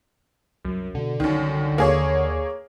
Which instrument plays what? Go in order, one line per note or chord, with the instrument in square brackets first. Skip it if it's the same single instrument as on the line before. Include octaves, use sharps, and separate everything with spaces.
[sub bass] C2 [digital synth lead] F#2
[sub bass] B2 [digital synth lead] D3
[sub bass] C2 [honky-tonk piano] F#2 D#3
[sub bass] D#2 [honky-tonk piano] A#3 G#4 C#5